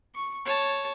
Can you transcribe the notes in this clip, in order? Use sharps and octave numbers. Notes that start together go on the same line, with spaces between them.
C#6
C#5 A5